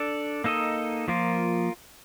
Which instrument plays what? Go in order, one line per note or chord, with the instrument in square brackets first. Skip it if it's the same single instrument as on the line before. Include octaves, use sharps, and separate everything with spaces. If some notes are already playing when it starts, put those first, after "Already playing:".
Already playing: [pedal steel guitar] D4 A4 D5
A#3 D#4 A4 D#5
F3 A#3 F4 A#4